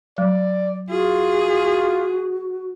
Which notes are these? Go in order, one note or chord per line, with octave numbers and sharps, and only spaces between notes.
F#3 D5
F4 F#4 G#4